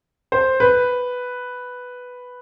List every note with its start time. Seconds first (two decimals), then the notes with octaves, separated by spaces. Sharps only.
0.32 C5
0.60 B4